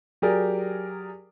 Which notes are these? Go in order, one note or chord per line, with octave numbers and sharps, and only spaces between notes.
F#3 G4 G#4 A#4 D5